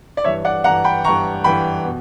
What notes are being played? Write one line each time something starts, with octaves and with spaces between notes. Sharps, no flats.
D5
G2 E3 C#5 E5
D5 F#5
G2 E3 F#5 A#5
G5 B5
G2 E3 A#5 C#6
G2 E3 G5 B5
B2